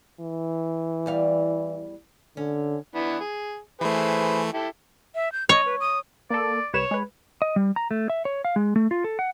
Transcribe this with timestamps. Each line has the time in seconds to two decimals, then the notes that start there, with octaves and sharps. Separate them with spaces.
0.20 E3
1.06 E2 G3 F5
2.37 D3 C#4
2.95 E3 B3 D4
3.20 G#4
3.81 E3 A3 G#4 B4 C5
4.54 E4 G4 A4
5.15 E5
5.32 G6
5.49 C#5 D#5
5.66 B4
5.80 D#6
6.30 A#3 A4 D5
6.74 C2 B4 C#5 E7
6.91 G#3 B4
7.42 D#5
7.56 G3
7.76 A#5
7.91 A3
8.10 E5
8.25 C#5
8.45 F5
8.56 G#3
8.76 A3
8.91 F4
9.04 A4
9.19 F#5